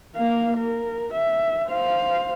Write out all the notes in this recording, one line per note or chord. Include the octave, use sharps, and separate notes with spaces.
A#3 F5
A#4
E5
C5 F5